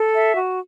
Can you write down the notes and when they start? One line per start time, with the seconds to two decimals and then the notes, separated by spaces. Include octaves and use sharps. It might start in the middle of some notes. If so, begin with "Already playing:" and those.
Already playing: A4
0.15 E5
0.36 F#4